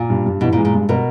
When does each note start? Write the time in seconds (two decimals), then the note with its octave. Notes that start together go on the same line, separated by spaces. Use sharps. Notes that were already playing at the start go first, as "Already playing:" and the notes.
Already playing: A#2
0.10 G2
0.26 G2
0.41 B2 E3
0.53 A#2
0.58 G#3
0.65 A#2
0.73 G2
0.89 B2 A#4